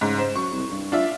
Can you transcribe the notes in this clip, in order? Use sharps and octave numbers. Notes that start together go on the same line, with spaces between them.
G#2 C#3
C5
F#2 C#6
C2
G2
D4 F4 E5